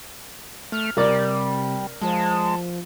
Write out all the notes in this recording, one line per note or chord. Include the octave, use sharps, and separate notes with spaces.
A3 F6
C3 G3 A#4 D5
F3 G#3 A5